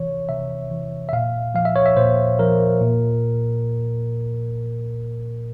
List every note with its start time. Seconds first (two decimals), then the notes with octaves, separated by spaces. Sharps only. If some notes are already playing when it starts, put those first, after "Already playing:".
Already playing: C3 E3 C#5
0.29 C3 E5
0.71 E3
1.09 E5
1.13 A#2 F5
1.55 F3 F5
1.65 E5
1.76 C#5
1.86 E5
1.97 A#2 C5
2.39 F3 A#4
2.81 A#2